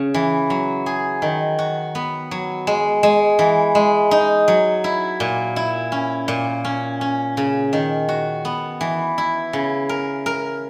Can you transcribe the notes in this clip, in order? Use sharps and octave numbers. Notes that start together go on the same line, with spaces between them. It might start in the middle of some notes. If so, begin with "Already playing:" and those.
Already playing: C#3
E3
F#3
G#4
D#3
F#4
B3
F#3
G#3
G#3
E3
G#3
D#4
F#3
E4
A#2
E4
C#4
A#2
C#4
C#4
C#3
D#3
F#4
B3
E3
E4
C#3
A#4
A#4